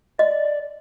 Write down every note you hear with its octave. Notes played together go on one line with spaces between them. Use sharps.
D5 D#5